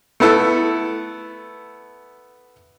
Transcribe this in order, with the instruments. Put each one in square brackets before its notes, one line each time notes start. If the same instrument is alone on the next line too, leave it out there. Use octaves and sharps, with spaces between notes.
[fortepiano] A3 B3 E4 A4